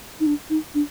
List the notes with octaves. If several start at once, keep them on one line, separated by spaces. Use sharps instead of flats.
D#4
D4
D#4
D4